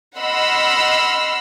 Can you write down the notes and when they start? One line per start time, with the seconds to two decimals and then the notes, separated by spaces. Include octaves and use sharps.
0.18 D#5 F#5 B5 C6 E6 F6